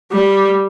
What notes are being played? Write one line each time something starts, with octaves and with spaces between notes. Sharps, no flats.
G3